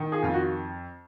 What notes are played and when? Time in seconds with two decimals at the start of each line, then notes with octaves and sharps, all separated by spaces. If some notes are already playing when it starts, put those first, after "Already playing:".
Already playing: D#3
0.12 F4 G#4
0.22 F2 F4
0.33 F#4